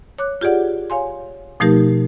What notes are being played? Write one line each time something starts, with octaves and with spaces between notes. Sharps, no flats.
C#5 D6 F#6
F4 G4 G#4 D5 F#5
C#5 F5 G#5 C6
B2 F3 A3 D#4 G4 A#4